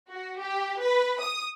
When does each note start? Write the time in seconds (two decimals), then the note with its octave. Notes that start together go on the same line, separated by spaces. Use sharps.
0.11 F#4
0.40 G4
0.81 B4
1.22 D#6